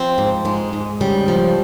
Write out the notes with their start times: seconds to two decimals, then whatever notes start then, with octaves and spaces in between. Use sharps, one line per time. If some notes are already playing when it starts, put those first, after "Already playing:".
Already playing: F3 C4
0.18 G#2
0.45 G#2 G#3
0.73 G#2
1.01 C#3 G3
1.28 F3